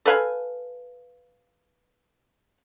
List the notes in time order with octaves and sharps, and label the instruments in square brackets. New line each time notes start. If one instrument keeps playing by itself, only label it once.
[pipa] A4 B4 F5 G#5